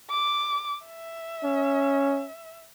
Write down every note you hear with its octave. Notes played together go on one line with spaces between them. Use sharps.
D6
E5
C#4